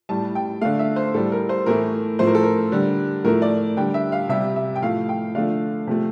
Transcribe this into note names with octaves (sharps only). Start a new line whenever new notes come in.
A2 G3 A5
G5
D3 A3 F5
E5
C5
A2 G3 A4
A#4
C5
A2 E3 A3 A#4
A2 F3 A3 C5
A#4
A4
A#4
D3 G3
A2 F3 A3 A#4
D5
D3 G3 G5
E5
F5
C3 G3 E5
E5
G5
A2 F3 A3 F5
G5
D3 F3 A3 F5
C3 F3 A3